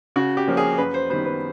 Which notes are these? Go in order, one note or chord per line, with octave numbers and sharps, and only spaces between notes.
C#3 F#4
G4
F3 A#3 C#4
G#4
F#2 B4
C5
D#3 G3 B3 C5
B4